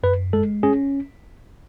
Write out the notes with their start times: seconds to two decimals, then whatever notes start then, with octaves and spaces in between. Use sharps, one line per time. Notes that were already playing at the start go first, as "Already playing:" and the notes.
0.03 F#2 B4
0.33 G#3 A4
0.63 C#4 G#4